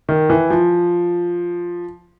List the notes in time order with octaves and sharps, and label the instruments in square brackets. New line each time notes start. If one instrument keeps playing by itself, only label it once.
[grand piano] D#3
E3
F3